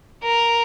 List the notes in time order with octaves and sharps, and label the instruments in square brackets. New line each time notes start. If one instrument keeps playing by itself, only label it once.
[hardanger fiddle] A#4